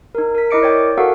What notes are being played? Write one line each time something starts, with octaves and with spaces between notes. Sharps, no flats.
D#4 A#4
A#4 B6
E4 A#4 D#5 D6 C#7 D7
C#5 D5 G5
F#4 A4 A#4 F5 F#5